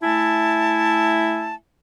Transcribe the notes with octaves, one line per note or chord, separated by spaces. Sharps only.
A3 E4 E5 G#5 A5